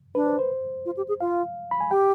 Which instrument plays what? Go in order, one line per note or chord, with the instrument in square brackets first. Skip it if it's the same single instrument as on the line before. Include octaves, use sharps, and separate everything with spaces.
[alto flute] D4 [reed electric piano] B4
[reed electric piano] C5
C5
[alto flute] F4
G4
G#4
[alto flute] F4 [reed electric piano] F5
[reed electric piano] B5
G#5
[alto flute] G4 [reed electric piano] G5